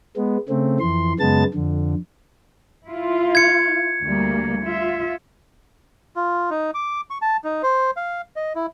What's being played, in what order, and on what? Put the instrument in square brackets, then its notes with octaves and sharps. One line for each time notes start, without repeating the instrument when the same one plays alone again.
[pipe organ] G#3 B3
C#3 A3 C4
F2 E3 C6
F#2 C#3 G#3 B3 A5 A6
F2 D3
[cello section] E4 F4
[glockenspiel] G#6 C#7
[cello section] D2 G3 A#3
F4 E5
[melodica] F4
D#4
D6
C#6
A5
D#4
C5
F5
D#5
E4